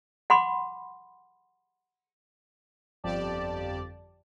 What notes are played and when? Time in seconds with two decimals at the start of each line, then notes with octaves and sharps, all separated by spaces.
0.30 F#5 B5 C6 D6
3.04 G1 F2 F3 G4 D5 A5